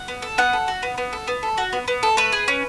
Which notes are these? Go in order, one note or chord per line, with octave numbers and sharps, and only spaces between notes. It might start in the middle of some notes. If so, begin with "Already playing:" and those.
Already playing: F#5
B3
A4
B3 F#5
A4
F#4
B3
B3
A4
B3
A4
F#4
B3
B3
A4
A3 B4
G#4
C#4